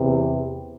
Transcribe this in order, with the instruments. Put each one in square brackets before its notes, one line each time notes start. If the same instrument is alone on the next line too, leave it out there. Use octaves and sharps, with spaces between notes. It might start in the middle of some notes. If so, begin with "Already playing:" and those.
Already playing: [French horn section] E2 C3 E3